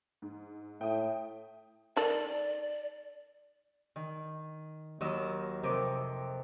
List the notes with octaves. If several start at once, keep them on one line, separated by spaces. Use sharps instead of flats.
G#2
A2 E5 G5 D#6
D#3 A4 D5
D#3
D#2 D#3 F#3 D#5 E6
F2 C3 A#4 D#5 D6